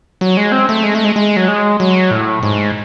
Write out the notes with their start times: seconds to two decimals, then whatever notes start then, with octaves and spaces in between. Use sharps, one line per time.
0.21 F#3
0.37 G#3
0.52 C4
0.69 A3
0.84 G#3
0.95 A3
1.05 G#3
1.16 G#3
1.36 F#3
1.48 G#3
1.80 F#3
2.11 A2
2.43 G#2